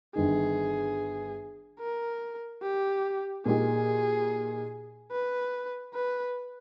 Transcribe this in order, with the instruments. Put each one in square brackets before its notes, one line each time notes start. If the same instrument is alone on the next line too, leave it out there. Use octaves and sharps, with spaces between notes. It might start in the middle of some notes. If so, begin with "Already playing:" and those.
[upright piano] G1 G2 D#3 [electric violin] G#4
[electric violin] A#4
G4
[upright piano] A#2 A#3 D#4 G4 [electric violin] G#4
[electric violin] B4
B4